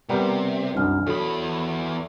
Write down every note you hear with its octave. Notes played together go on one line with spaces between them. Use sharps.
C3 G3 B3 A#4
C2 F#2 D4 F6
E2 F#3 A4 B5